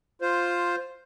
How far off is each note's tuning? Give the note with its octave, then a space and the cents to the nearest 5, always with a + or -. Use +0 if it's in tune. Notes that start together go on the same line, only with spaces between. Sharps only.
F4 +5 C5 +0